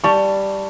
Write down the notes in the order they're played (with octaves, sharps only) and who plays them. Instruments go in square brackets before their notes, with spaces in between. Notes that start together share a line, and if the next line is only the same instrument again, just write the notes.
[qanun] G3 [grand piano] A5 C#6